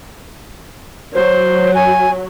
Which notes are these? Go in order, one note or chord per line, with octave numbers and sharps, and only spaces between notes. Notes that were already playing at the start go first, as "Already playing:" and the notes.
F#3 C5
G#5